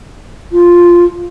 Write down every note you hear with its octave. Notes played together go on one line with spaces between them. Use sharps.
F4